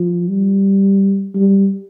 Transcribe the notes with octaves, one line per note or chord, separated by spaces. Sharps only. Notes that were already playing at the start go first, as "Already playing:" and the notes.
Already playing: F3
G3
G3